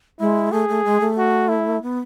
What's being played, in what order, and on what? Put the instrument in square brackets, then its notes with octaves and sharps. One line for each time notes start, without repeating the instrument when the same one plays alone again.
[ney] G#3 [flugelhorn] E4
[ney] A3 [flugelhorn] G#4
[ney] A3
G#3
A3
[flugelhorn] F#4
E4
[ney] B3